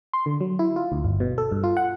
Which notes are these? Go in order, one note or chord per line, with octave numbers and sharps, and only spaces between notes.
C6
D3
F#3
E4
F4
D2
G1
B2
A4
G2
F4
F#5